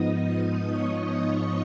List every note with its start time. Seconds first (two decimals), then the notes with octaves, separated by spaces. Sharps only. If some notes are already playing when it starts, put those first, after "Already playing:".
Already playing: G#2 F3 B3 D#4 D#5 D#6
0.69 C#5 C#6